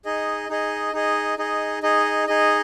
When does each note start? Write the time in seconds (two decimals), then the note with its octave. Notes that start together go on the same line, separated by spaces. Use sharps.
0.05 D#4 G#4 D#5
0.49 D#4 G#4 D#5
0.93 D#4 G#4 D#5
1.38 D#4 G#4 D#5
1.83 D#4 G#4 D#5
2.27 D#4 G#4 D#5